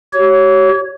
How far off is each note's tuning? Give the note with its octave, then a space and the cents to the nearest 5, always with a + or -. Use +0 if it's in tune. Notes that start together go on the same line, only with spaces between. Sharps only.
G4 -45 C#5 +0